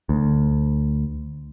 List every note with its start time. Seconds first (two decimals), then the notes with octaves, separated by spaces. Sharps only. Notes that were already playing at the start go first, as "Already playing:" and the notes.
0.09 D2